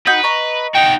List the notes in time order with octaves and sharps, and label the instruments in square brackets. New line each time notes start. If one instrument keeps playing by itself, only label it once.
[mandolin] D#4 F#4 G6 [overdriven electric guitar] B4
[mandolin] D#5 A#5 C#6
[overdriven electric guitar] D#4 F#4 [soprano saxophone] G5